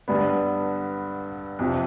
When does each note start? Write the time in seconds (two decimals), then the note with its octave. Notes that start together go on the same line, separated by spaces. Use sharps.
0.08 G2 D3 G3 B3
1.59 F2 C3 F3